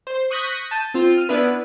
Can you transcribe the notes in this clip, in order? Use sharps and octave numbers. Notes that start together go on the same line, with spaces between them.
C5
C#6 D#6 F#6 G6 A#6 B6
A5 G6 D#7
C4 F4
F6 D#7
B3 D4 E4 B4